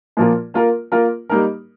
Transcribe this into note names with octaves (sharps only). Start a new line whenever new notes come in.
A#2 F3 A#3 F4 A#4
A#3 F4 A#4
A#3 F4 A#4
G3 A#3 D#4 A#4